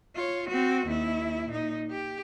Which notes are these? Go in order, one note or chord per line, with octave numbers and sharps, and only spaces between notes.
F4 C#5
C4 F#4
D#2 E4
A#2 D#4
G4